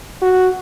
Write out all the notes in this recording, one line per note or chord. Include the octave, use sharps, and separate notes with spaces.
F#4